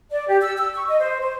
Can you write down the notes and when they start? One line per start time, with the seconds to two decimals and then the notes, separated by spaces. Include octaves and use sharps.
0.11 D5
0.28 G4
0.42 E6
0.58 E6
0.75 C#6
0.88 D#5
0.99 C5
1.21 C5